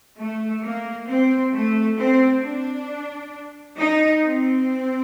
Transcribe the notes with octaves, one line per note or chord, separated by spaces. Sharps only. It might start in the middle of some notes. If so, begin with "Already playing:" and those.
A3
A#3
C4
A3
C4
D4
D#4
C4